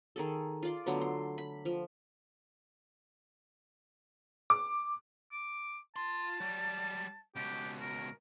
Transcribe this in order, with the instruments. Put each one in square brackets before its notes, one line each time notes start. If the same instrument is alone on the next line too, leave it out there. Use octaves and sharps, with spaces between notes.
[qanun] D#3 G#4 A4
F4 D5 C6
D3 F#3 A3 B3
C6
B5
F3
[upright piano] D6
[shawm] D6
[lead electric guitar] F4 C6 [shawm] A5
[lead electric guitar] F#3 G3
[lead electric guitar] C#2 B2 [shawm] G4
[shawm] A#4